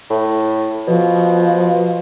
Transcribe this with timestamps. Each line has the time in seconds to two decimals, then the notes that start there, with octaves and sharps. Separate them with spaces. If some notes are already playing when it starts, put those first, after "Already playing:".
0.10 A2
0.87 B2 F3